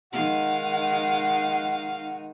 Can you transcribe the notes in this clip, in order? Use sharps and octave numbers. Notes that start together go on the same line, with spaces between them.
D#3 G#3 D#4 F5 F#5 F6